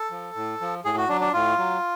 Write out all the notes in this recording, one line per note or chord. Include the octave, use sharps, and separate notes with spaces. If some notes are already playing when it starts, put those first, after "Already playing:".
Already playing: A4
F3
A2
F3
A2 G#4
F#4
F#3 D4
D4
A2 F4
F#3